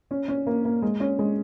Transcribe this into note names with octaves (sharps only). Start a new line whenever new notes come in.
C#4
C#4
A#3
A#3
G#3
C#4
G#3